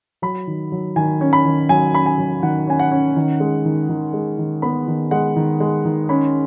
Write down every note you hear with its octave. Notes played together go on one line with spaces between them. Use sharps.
F#3 B5
D#3
F#3
D#3 G#5
C#4
B5
D#3
F#3 G#5
C#4 B5
G#5
F#3
D#3 F#5
C#4 G#5
F#5
C#4
D#3
G#3
D#3
D#3
G#3
D#3
B3 B5
D#3
G#3 F#5
D#3
G#3
D#3
C#4 B5